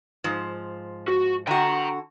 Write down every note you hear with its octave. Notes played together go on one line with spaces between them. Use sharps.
G#2 F3
F#4
D3 F#4 G5 A#5